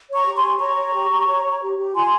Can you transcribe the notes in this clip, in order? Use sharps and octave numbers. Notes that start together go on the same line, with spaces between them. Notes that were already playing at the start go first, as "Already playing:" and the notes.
C#5
A#5 C#6
G4
G#5 C6
G4
C#5 A#5 C#6
C#5
G4
G4
C#5
C#5
G4
G4
F4 G#5 C6